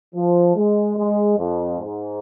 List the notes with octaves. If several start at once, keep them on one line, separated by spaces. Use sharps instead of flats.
F3
G#3
G#3
F2
G#2